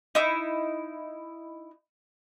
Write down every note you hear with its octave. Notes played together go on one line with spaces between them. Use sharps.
D#4 E4